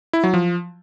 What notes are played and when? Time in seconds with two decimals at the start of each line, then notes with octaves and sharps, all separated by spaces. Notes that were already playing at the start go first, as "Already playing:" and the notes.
0.13 E4
0.24 F#3
0.34 F3